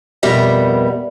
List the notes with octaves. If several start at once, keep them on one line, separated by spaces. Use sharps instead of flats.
F2 B2 G3 B3 A#4 E5